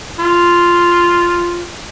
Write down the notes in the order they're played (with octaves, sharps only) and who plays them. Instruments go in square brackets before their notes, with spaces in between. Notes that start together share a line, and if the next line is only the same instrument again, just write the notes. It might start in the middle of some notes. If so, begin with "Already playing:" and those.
[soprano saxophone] F4